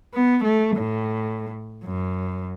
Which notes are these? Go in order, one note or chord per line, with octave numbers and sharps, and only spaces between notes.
B3
A3
A2
F#2